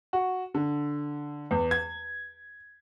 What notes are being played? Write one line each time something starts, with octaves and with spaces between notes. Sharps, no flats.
F#4
D3
E2
G#6